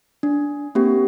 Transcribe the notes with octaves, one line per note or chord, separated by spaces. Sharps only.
D4
A#3 C4 G4